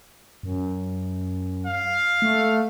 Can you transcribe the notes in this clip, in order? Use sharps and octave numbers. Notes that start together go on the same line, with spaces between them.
F#2
F5
A3